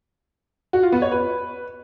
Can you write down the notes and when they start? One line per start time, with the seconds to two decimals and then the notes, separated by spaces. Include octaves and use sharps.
0.73 F#4
0.83 F4
0.92 B3
1.02 C#5
1.12 B4